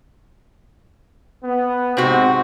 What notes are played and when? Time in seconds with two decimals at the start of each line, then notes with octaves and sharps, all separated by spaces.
1.44 B3
1.97 G#2 C3 C4 F#4